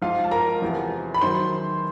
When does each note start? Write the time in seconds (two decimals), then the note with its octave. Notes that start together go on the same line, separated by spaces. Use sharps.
0.02 G#2 F3 F4 F5
0.24 A5
0.31 A#4 A#5
0.62 E2 C3 F3
1.14 B5
1.21 D#3 F#3 C5 C6